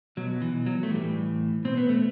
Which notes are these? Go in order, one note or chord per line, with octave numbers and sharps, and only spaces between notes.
B2 F#3
E3
F#3
A3
A2 E3 G3
B2 C4
B3
A3